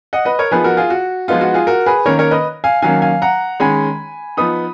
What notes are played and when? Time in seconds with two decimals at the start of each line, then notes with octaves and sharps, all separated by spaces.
0.13 D#5 F#5
0.25 B4 D#5
0.39 A#4 C#5
0.51 F3 B3 D#4 G#4 B4
0.64 F#4 A#4
0.77 F4 G#4
0.90 F#4
1.28 F3 G#3 B3 D#4 F4
1.41 F#4
1.54 F4 G#4
1.67 F#4 A#4
1.86 G#4 B4
2.06 D#3 A#3 C#4 A#4 C#5
2.19 A#4 C#5
2.31 B4 D#5
2.64 F5 G#5
2.82 D#3 F#3 A#3 C#4 F5 G#5
3.02 F5 G#5
3.22 F#5 A#5
3.60 D#3 G#3 C#4 G#5 B5
4.37 F3 B3 D#4 B5 D#6